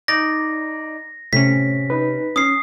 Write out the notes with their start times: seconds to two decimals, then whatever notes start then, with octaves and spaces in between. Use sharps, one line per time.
0.08 D#4 D5 A#6
1.33 A2 C3 C#4 B6
1.90 D#4 B4
2.36 C#4 D#6 C7